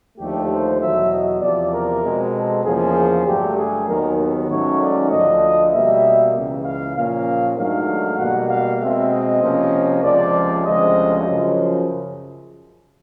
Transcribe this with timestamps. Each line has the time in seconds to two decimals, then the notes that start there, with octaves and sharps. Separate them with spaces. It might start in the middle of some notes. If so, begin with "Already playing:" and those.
0.18 D#2 D3 F3 A3 G4
0.49 C5
0.80 E2 B2 F#3 E5
1.10 D#5
1.41 E2 C3 F3 D5
1.72 A#4
2.03 B2 G#3 C4
2.34 A4
2.64 E2 C#3 F3 A#3 G#4
3.26 G2 D3 F#3 A3 G4
3.57 G#4
3.87 D#2 D#3 F#3 B3 A#4
4.49 G#2 D#3 F#3 A3 C#4 C#5
4.80 D5
5.11 D2 D3 F3 D#5
5.72 B2 G3 A#3 E5
6.34 C#2 C#3 E3
6.65 F5
6.95 A#2 F3 A#3 C#4 F5
7.57 G#2 D#3 F#3 A3 D4 F5
8.18 B2 G3 A#3 F#5
8.49 F5
8.80 B2 G#3 C4 E5
9.11 D#5
9.42 C3 F3 A#3 C#4
10.03 C#2 C3 F3 G#3 D5
10.65 D2 C3 F3 G#3 C#4 D#5
11.26 F#2 C#3 F3